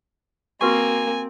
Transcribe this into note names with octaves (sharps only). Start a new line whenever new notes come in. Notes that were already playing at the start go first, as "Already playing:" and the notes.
A#3 C4 F#4 B4 G#5 C#6